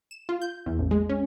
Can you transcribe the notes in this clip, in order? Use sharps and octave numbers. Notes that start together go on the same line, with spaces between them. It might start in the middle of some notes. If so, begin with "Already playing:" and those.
E7
F4
G6
E2
A1
G#3
C#4